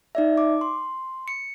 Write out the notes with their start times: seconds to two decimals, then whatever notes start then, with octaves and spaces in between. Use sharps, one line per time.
0.15 D#4 D5 E5
0.38 D6
0.61 C6
1.28 C#7